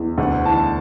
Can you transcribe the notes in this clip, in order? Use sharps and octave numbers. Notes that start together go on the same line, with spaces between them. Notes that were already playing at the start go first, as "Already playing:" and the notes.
Already playing: E2
D2 F#5
E3 A5